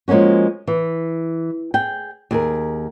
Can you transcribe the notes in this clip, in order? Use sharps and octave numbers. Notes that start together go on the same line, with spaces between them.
F3 G#3 A#3 C#4 F#4
E3
G#4 G5
D#2 G#4 A#4